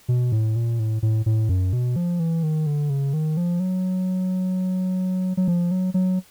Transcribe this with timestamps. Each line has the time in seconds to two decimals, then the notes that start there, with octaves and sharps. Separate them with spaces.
0.08 B2
0.32 A2
0.56 A#2
0.79 A2
1.03 A2
1.26 A2
1.49 F#2
1.73 B2
1.96 F3
2.20 E3
2.43 D#3
2.66 D3
2.90 C#3
3.14 D#3
3.37 F3
3.60 F#3
5.37 F#3
5.48 F3
5.71 F#3
5.94 F#3